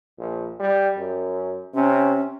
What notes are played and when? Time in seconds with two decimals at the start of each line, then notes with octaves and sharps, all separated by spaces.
0.19 A#1
0.60 G3
0.97 F#2
1.74 C3 C#4